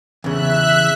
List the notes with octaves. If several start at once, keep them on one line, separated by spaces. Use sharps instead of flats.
E2 C#3 E5 F#6